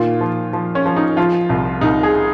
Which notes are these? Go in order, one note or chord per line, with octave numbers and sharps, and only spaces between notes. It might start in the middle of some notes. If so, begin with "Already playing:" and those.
Already playing: A#2 D#3 F4
F3
F3
C#4
F3
D#4
F3 F4
C2
C2 D#4
G#4